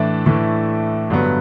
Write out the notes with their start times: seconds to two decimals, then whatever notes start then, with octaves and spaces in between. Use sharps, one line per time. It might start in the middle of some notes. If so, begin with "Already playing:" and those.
Already playing: A2 E3 A3 D4 E4 D5 E5
0.26 A2 E3 A3
1.10 G2 D3 F#3 B3